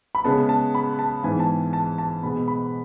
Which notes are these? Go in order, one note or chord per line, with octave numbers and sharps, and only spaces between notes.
B5
C#3 G#3 B3 A5
A5
B5
A5
G#2 E3 B3 G#5
A5
A5
A5
B2 G#3 B3 B5
B5